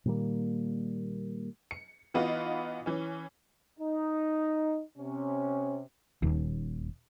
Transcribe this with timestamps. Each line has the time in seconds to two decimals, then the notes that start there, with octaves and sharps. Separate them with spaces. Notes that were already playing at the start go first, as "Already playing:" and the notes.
0.05 A#2 D#3 G3 A#3
1.71 C#7
2.14 E3 B3 D#4 F4 F#4
2.86 E3 C#4
3.79 D#4
4.98 C3 C#4
6.22 D#1 D#2